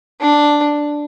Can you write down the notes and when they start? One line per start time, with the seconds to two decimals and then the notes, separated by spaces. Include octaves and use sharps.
0.21 D4